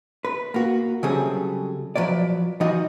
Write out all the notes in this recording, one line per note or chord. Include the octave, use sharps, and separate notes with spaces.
B4
A#3 F#4
C#3 F#3 G3 C4 G#4 A4
F3 F#3 B4 D5
E3 F3 D#4 F#4 D#5